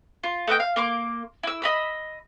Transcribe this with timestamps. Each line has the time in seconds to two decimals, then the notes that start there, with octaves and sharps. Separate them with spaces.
0.24 F4
0.47 A3 B4 D#5 G5
0.60 F5
0.76 A#3 C6 D6
1.43 E4 E6
1.62 D#5 B5 E6